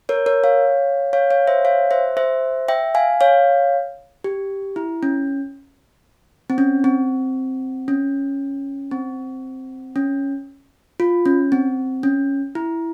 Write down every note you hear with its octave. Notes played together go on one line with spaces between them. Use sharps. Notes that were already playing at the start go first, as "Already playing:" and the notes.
A#4 C#5
A#4 C#5
C#5 F5
C#5 F5
C#5 F5
C5 E5
C#5 F5
C5 E5
C5 E5
E5 G5
F5 G#5
C#5 F5
G4
E4
C#4
C4
C#4
C4
C#4
C4
C#4
F4
C#4
C4
C#4
E4